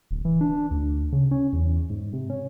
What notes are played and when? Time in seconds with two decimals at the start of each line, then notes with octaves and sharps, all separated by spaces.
0.11 D1
0.25 E3
0.41 D4
0.71 D2
1.12 C#3
1.31 C#4
1.53 E2
1.90 G#2
2.13 C3
2.30 C#4